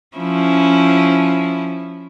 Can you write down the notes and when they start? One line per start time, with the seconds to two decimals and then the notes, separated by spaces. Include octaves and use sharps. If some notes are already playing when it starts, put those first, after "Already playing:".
0.17 F3 C#4 E4